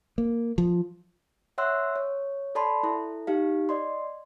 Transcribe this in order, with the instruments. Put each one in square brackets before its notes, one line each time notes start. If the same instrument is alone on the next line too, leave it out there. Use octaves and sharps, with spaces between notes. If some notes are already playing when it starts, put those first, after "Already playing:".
[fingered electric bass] A#3
F3
[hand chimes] C#5 E5 F#5 C6 E6 F#6
C#5
A4 D5 A5 B5 C6
E4 A4
D#4 G4 F5
D5 D#5 C6